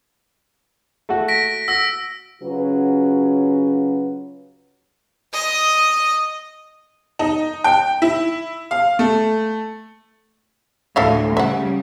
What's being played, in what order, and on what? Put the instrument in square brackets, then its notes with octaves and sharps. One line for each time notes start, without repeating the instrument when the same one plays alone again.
[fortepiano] A3 F#4
[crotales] A#6 B6 D7
[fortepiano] F#4 [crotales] E6 A#6
[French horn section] C#3 F#3 C#4 F4 F#4 B4
[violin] D#5
[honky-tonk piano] D#4
G5
E4
F5
A3
[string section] D2 A2 [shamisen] A4 E5 F5
[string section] C#3 G3 [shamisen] E5 F#5